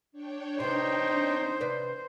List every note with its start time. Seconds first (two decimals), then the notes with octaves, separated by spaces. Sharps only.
0.12 D4 C#5 G5
0.60 C3 B3 D#4 C5
1.61 C3 B4 D5